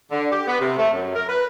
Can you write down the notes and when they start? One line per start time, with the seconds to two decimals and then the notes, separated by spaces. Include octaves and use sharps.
0.11 D3
0.31 G4
0.46 B3
0.60 C3
0.78 A3
0.93 F#2
1.15 A#4
1.28 B4